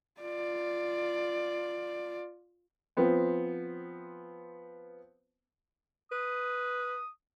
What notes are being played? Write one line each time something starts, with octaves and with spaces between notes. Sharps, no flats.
F4 D5
F3 B3 C4
B4 D#6